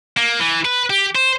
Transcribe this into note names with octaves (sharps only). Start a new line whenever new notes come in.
A#3
E3
B4
G4
C5